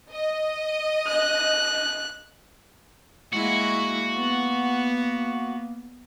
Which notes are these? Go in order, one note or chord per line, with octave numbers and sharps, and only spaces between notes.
D#5
F#6
G#3 A#3 E4 F#4
B3